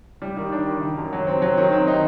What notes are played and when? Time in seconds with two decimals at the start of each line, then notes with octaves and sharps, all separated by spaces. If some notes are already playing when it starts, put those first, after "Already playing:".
0.22 G3
0.37 D#3
0.52 D4
0.67 D#3
0.82 D#3
0.98 F#2
1.13 F#3
1.27 C4
1.42 F#3
1.57 D#3
1.72 C4
1.87 D#4